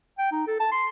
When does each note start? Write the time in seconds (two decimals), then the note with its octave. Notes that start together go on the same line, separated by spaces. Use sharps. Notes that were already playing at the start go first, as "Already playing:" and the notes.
0.19 G5
0.32 D#4
0.47 A4
0.60 A5
0.72 C6